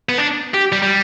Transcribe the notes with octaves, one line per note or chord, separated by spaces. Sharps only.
B3
D4
G4
G3
G3